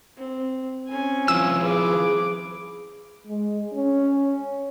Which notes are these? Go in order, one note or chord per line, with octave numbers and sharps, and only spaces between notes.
C4
C4 C#4 G#5
F3 E4 F4 E6
G#4 B4 D6
G#3
C#4